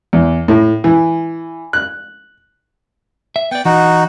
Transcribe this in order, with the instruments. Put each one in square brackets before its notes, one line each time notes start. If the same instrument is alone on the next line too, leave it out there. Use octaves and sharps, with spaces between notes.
[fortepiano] E2
A2
E3
F#6
[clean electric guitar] E5
[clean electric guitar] B3 D5 [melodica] G5
[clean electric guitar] E3 [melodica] D#4 F#4